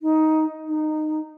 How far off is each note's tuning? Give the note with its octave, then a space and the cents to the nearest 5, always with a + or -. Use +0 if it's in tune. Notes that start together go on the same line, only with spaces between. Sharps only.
D#4 +10
D#4 -15